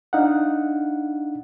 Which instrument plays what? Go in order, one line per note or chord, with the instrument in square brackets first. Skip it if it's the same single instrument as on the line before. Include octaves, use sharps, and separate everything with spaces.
[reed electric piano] D4 D#4 F5 F#5